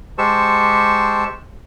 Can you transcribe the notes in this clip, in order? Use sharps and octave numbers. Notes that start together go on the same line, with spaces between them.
G#3 G4 C5 A5 C#6 E6